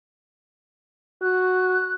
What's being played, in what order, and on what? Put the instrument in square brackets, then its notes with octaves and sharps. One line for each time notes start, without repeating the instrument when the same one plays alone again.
[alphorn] F#4 [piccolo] F#6